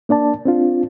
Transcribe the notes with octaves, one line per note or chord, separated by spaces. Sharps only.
A#3 D4 D5 A5
C4 D4 F4